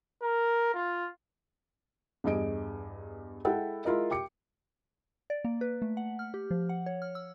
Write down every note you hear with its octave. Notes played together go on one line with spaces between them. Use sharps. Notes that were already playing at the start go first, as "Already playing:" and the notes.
A#4
F4
E2 G2 G#4 D#5 D7
G#3 E4 A4 F#5 G5
G#3 E4 F4 A#4 D#5
G5 D6 C#7
D5
A#3
B4
A3
F#5
F6
G4
F3
F#5
C#5
F6
E6